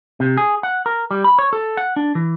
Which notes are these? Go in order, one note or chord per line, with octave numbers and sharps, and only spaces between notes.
C3
G#4
F#5
A#4
G3
B5
C#5
A4
F#5
D4
E3